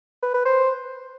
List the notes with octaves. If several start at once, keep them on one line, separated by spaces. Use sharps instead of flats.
B4
B4
C5